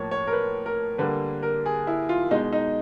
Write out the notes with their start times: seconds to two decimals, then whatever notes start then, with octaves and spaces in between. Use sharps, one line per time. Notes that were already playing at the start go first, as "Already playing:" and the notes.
Already playing: A2 F3 A#3 C#5
0.11 C#5
0.27 A#4
0.33 B4
0.66 A#4
0.98 D3 G3 A#3 B4
1.43 A#4
1.66 G#4
1.87 E4
2.09 F4
2.31 B2 G#3 D#4
2.53 D#4